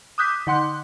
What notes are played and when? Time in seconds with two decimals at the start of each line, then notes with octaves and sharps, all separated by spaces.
0.18 D6 D#6 F#6 G6 B6
0.47 D3 F#5 C6 F#6